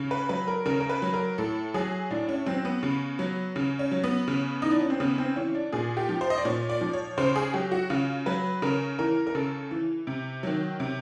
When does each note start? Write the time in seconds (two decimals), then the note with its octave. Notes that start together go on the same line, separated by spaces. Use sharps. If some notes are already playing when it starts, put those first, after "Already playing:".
Already playing: C#3
0.11 B4
0.29 F#3 B4
0.47 A#4
0.66 C#3 A#4
0.80 A#4
0.89 B4
1.02 F#3
1.14 A#4
1.38 A2 A4
1.74 F#3 G#4
2.11 A2 D4
2.29 C#4
2.46 F#3 C4
2.65 B3
2.83 C#3
3.19 F#3
3.56 C#3
3.79 C#4
3.91 F#3
4.04 B3
4.28 C#3
4.62 E3 D#4
4.71 D4
4.81 C#4
4.90 C4
5.00 C#3 B3
5.18 C4
5.36 E3 C#4
5.55 D4
5.73 A#2 G#4
5.97 G4
6.09 F3
6.21 C5
6.30 D#5
6.38 D5
6.45 A#2 C#5
6.69 D5
6.81 F3
6.93 C#5
7.18 C#3 C5
7.36 G#4
7.54 F#3 G4
7.72 F#4
7.90 C#3 F4
8.26 F#3 B4
8.62 C#3 A#4
8.99 E3 A#4
9.27 A#4
9.35 C#3 A4
9.71 E3
10.07 C3
10.43 D#3 F#3
10.80 C3